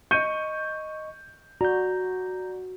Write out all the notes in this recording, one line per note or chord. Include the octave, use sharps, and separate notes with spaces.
D#5 C#6 G6 C#7 D#7
F#4 D5 A#5 G6